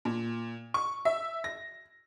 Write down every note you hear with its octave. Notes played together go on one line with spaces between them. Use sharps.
A#2
C#6
E5
A#6